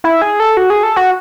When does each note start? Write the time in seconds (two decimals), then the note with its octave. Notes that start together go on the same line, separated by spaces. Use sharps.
0.04 E4
0.22 G#4
0.40 A4
0.57 F#4
0.70 G#4
0.83 A4
0.96 F#4